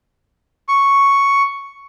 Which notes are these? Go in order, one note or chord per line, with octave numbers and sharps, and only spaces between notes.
C#6